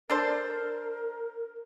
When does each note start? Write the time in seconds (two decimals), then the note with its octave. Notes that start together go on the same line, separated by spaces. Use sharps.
0.10 D4 A4 A#4 C5